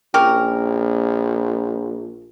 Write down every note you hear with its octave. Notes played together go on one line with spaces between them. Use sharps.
A#1 C#4 G4 A#4